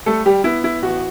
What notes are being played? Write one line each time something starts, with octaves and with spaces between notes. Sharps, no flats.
G3 A3 A4
G3 G4
B3 E4
E4
A1 F#4